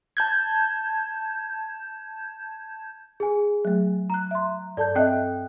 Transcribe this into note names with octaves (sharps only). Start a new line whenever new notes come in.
A5 G6 G#6
G#4 G#5
F#3 A3
A#5 F#6
E5 C6
G2 A4 D5 A5 G6
C4 A4 D#5 E5 G5 F#6